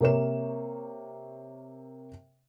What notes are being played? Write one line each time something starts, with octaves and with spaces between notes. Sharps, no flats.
C3 A#3 A#4 C#5 E7